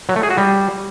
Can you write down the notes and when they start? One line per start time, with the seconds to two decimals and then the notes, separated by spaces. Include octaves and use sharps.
0.09 F#3
0.16 A3
0.23 G#4
0.30 F#4
0.38 G3